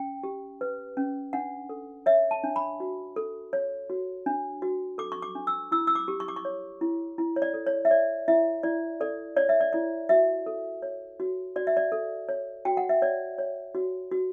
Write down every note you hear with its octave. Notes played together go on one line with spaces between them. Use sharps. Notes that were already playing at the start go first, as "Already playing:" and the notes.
Already playing: C#4 G5
G4
B4
C#4
D4 F#5
A4
C#5 E5
A5
D4
B5
F#4
A4
C#5
F#4
D4
F#4
A4 D6
C#6
D6
D4
E6
E4 E6
E6
D6
G4
C#6
D6
C#6
C#5
E4
E4
C#5
D5
A4
C#5
E5
C#5 D5
E4 E5
E4 D5
A4 D5
C#5 D5
E5
D5
E4 D5
F#4 E5
A4
C#5
F#4
F#4 D5
E5
D5
A4
C#5
F#4 G5
F#5
E5
C#5 D5
C#5
F#4
F#4